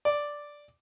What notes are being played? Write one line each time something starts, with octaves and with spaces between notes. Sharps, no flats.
D5